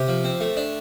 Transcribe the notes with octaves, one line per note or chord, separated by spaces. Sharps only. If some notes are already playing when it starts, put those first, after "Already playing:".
Already playing: C3 G4
F3
C4
A3
D4